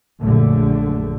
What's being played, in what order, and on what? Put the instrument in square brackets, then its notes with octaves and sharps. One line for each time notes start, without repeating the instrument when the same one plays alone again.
[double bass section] A#1 F#2 D3 A3